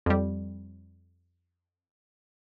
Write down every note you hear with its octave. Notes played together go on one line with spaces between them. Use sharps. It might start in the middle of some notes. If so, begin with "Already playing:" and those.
F2 G3